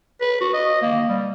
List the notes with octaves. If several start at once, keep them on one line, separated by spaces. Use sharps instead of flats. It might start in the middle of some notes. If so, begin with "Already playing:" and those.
B4
F#4
D#5
A#3
G3